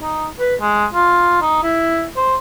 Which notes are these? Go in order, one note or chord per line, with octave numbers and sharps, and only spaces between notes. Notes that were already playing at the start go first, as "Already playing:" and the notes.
D#4
B4
G#3
F4
D#4
E4
C5